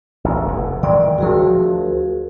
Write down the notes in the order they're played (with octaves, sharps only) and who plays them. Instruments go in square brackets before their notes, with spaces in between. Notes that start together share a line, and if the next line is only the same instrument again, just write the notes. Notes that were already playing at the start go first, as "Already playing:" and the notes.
[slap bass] A1 D2
F1 E2
[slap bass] D#3 E3 G#3 [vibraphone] D5 G5
[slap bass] D2 F3 [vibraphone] F#4 G#4 A#4